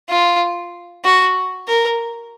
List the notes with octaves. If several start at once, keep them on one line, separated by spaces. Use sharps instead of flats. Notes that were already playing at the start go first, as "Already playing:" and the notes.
F4
F#4
A#4